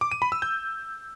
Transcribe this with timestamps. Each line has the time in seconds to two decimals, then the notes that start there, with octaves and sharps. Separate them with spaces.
0.01 D6
0.11 D#7
0.22 B5
0.32 E6
0.42 G6